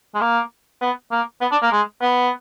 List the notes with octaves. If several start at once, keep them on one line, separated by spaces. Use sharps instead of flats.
G#3
A#3
B3
A#3
B3
D4
A#3
G#3
B3